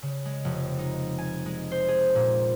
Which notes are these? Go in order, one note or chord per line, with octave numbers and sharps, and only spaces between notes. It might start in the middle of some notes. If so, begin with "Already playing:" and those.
C#3
G#3
F1
D#4
G#5
G#3
C5
G#4
A#2